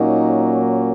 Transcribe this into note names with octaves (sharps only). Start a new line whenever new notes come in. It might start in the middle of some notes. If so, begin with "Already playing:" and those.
Already playing: A#2 F#3 A#3 C#4 D#4